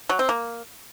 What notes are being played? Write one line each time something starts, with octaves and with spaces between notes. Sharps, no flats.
F#3
C4
A#3